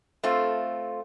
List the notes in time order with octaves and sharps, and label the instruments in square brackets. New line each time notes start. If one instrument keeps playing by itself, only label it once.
[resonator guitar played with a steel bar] A3 C4 F4